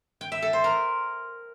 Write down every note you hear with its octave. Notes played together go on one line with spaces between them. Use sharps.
G5
E5
A4
C5
A#4